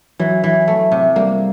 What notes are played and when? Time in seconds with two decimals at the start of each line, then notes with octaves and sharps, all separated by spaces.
0.19 E3 F#3
0.44 E3
0.68 A3
0.92 C3
1.16 G3 A#3